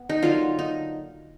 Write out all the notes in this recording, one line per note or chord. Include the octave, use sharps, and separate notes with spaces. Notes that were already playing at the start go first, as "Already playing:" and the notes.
Already playing: B3
D#4
D3 F#3 A#3 D#4 F4
D#4